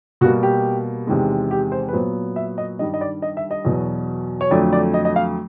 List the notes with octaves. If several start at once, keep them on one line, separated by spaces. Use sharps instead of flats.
B2 G3 A#3 F#4
G4
E2 C3 D#3 G#3
G4
C5
B4
A#2 F#3 B3 C5
E5
D#5
G2 D#3 G3 D#5
D#5
D5
D#5
E5
D#5
E2 B2 F#3
C#5
F2 D3 F#3 A3 D5
D5
D#5
D#5
F5